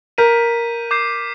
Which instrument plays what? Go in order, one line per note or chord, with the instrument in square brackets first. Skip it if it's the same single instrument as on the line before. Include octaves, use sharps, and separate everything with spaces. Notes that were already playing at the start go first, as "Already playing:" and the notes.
[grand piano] A#4 [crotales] G6 B6 D#7
[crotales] D6 G6 C7